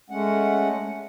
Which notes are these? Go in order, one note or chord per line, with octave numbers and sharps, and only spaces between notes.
G#3 A3 C#4 F#5